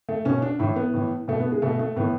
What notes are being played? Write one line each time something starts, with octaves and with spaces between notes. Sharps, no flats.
A3
B2 C#4
D4
A2 E3 E4
B3
A2 E3
B2 A3
B3
G#3
B2 A3
A3
A2 E3 B3